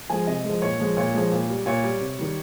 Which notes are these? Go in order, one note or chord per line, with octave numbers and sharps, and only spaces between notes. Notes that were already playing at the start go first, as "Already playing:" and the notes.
F3 G#3 G#5
C3 D#5
G#3
F3
A#2 C#5
F3 G#3
A#2 C#5
F3 G#3
A#2
G3
A#2 C#5
G3
C3
D#3 G3